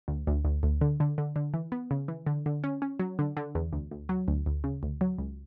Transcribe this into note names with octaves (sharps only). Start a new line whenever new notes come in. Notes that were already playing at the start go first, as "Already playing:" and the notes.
D2
D2
D2
D2
D3
D3
D3
D3
E3
B3
C#3
E3
D3
D3
C#4
C#4
F#3
D3
D3
E2
D2
D2
F#3
D2
D2
C#3
D2
F#3
C#2